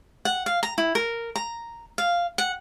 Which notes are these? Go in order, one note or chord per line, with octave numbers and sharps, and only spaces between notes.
F#5
F5
A#5
E4
A#4
A#5
F5
F#5